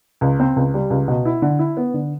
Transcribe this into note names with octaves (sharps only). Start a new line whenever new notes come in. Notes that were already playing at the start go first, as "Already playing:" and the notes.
C#2
C4
C#2
G3
C#2
B2
E4
D3
E4
B3
D3